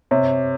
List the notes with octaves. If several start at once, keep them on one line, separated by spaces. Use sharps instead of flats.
C3 C#5